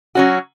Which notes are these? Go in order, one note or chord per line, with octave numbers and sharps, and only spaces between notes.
F#3 C#4 F#4